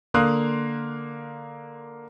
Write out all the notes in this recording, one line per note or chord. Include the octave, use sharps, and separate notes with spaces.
D3 A#3 F5 C6 D#6 F#6